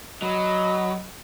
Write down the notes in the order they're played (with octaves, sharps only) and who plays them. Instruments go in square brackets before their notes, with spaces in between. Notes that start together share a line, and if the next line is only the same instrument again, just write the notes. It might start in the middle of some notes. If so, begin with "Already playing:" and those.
[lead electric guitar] F#3 [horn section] D#5 [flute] B5